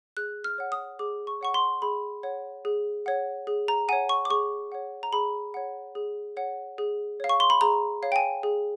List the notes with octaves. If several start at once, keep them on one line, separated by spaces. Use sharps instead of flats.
G#4 F#6
F6
C#5 F#5
D#6
G#4 D6
C#6
C#5 F#5 C#6
C6
G#4 B5
C#5 F#5
G#4
C#5 F#5
G#4
A#5
C#5 F#5 G#5
C#6
D6
G#4 C#6
C#5 F#5
A#5
G#4 B5
C#5 F#5
G#4
C#5 F#5
G#4
C#5 F5
C#6
C6
B5
G#4 A#5
C#5 F5
G5
G#5
G#4